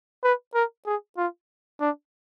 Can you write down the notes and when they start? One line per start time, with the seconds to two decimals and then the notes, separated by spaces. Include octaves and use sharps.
0.24 B4
0.54 A#4
0.86 G#4
1.17 F4
1.80 D4